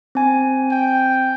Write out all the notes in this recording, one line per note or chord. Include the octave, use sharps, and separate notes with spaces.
C4 G#5
G5